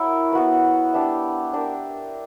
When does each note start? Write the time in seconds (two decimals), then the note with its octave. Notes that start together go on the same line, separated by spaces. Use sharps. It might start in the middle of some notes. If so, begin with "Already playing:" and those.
Already playing: E4 F#4 A#4 C#5
0.33 B3 F#4 B4
0.93 D4 G4 B4 E5
1.53 D4 G4 A#4 E5